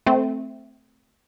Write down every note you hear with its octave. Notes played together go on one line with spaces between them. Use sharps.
A3 C4